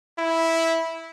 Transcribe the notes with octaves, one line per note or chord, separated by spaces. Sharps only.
E4